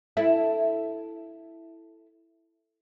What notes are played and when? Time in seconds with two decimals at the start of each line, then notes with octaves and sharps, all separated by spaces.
0.17 E4 A4